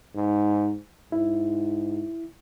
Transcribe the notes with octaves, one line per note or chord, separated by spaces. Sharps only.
G#2
G#2 E4